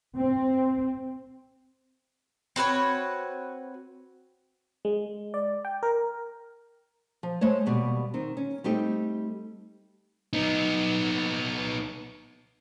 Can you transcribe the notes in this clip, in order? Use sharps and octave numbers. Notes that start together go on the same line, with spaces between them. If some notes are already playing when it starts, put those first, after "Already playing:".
C4
C4 F#4 B4 C#5
G#3
D5
G5
A#4
F3
G#3 A3 C5 C#5
D#2 B2 G3
D#3 C4
C#4
G3 A3 C4 D#4 G4
B3 D#4